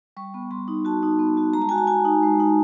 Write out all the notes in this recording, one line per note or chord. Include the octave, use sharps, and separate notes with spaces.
G3 C#6
B3
G3 C6
D#4
F#4 A5
D#4
B3
F#4
G#3 A#5
A5
F#4 G#5
A5
F#4 G#5
D#4
G#3
D#4